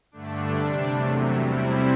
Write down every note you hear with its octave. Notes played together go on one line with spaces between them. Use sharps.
G2 D3 A3 D4
C3 G3 D4
E2 C3 F#3 A3
C3 G3 C4 E4